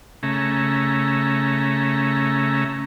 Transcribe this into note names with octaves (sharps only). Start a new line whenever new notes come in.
C#3 A3 C#4 E5 A#5